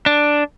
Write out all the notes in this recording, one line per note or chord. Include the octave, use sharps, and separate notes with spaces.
D4